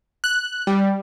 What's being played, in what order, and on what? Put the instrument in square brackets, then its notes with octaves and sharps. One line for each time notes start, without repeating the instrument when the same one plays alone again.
[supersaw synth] F#6
G3